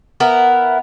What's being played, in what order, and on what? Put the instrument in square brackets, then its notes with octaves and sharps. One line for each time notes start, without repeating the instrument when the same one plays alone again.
[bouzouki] B3 E4 A#4